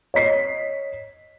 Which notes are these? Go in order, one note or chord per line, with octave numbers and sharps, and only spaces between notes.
C#5 D#5 B6 C7